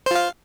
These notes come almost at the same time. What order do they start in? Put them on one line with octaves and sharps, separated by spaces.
C5 F4 F5